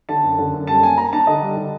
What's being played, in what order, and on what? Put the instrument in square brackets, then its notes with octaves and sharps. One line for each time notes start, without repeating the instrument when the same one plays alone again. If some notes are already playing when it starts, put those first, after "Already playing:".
[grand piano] D3 A5
F#2
D3
F#2
G3 A5
A#3 G#5
A#3 A#5
D4 A5
D3 D#5
G3
D3